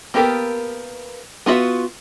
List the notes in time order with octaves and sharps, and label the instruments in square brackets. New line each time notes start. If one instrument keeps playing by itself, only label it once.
[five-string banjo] A#3 B3 G4 A4 A#4
B3 F4 F#4 E5